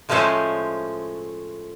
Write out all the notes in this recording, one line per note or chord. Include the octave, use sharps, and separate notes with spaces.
A2 F3 G#3 A3 C#4 C5